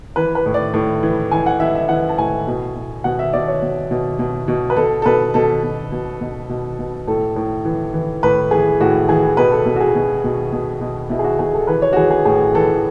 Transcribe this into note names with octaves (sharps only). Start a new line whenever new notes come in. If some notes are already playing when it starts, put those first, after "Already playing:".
E3 B4
B4
A2
D5
A2
E3
E3 G#5
F#5
E3 E5
E5
E3 F#5
A5
A2 G#5
B2
B2
B2 F#5
E5
B2 D5
C#5
B2
B2
B2
B2
B4
B2 A4
A4
B2 B4
B2 A4
B2
B2
B2
B2
B2
A2 A4
A2
E3
E3
A2 B4
E3 G#4
A2 F#4
E3 G#4
B2 B4
A4
B2 A4
F#4
G#4
B2
B2
B2
B2
B2 E4
G#4
F#4
B2 G#4
A4
E3 B4
C#5
F#4
E3 G#4
G#4
A2 G#4
E3 A4